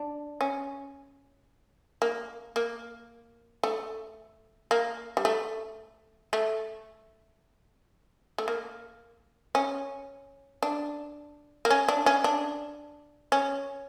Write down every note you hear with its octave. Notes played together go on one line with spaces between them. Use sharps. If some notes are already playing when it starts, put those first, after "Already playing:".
Already playing: D4
C#4
A#3
A#3
A3
A#3
G3
A3
A3
A3
A#3
C#4
D4
A#3
C#4
D4
C#4
D4
C#4